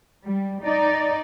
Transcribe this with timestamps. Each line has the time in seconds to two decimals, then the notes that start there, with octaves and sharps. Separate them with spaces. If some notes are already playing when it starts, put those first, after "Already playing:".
0.24 G3
0.62 D#4 D5